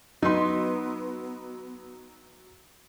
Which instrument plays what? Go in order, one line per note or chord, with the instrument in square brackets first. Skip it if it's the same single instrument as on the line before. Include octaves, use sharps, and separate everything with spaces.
[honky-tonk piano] F#3 C6 [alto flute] B3 [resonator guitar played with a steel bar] D#4 B4